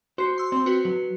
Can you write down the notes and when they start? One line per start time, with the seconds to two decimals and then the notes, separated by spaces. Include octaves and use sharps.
0.18 F#4 C5 C7
0.38 C6 E6
0.52 C4 C5
0.66 F#4 B4
0.85 F#3